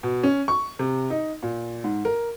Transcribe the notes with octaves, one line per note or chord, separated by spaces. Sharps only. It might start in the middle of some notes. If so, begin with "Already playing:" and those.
B2
C#4
C#6
C3
D#4
A#2
G#2
A#4